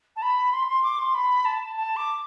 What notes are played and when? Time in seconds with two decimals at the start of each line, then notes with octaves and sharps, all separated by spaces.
0.16 A5
0.22 B5
0.53 C6
0.68 C6
0.83 D6
0.99 C6
1.15 B5
1.45 A5
1.76 A5
1.96 D6